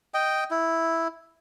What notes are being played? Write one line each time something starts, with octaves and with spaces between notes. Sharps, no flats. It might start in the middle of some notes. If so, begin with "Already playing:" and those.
D#5 G5
E4